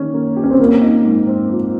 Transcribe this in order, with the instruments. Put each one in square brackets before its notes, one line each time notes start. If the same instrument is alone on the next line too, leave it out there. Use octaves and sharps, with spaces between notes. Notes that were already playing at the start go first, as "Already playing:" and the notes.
Already playing: [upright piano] D#3 A#3 C#4 G4
A#3
G4
[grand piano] C#4
C4
[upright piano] F3 [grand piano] A#3
[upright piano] D#4
G#2
C4
F3